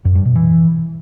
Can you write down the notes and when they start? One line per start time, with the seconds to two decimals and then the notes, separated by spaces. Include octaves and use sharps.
0.05 F#2
0.15 G2
0.25 B2
0.35 E3